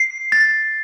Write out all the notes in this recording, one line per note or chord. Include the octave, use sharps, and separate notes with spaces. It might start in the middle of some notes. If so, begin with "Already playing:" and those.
Already playing: C7
A6